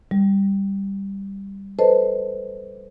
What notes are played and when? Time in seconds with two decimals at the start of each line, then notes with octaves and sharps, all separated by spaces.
0.11 G3
1.79 A4 B4 C5 D#5 A5